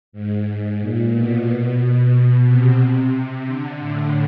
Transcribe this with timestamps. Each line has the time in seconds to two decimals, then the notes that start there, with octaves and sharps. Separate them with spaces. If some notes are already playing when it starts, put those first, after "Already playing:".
0.13 G#2
0.80 A#2
1.13 B2
2.46 C3
3.46 D3
3.79 A2